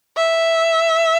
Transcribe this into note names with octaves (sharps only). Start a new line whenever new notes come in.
E5